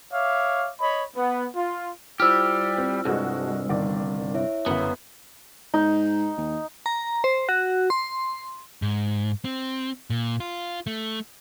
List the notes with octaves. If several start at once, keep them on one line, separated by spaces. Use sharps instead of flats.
C#5 E5 F5 D6
C#5 D#5 B5
B3
F4
G3 E4 F4 G4 C5 E6 F6
C4
C2 G2 G#3 F#4 A4
G1 D#3 D5
E4 C#5 E5
G1 F#2 B3
G#2 D#4
D#2
A#5
C5
F#4
C6
G#2
C4
A#2
F4
A3